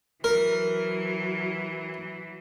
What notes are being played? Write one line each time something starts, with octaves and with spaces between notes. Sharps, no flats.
E3 F#3 A#4